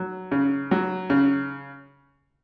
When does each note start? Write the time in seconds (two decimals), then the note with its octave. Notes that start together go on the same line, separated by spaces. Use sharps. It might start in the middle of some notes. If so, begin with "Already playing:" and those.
Already playing: F#3
0.32 C#3
0.71 F#3
1.10 C#3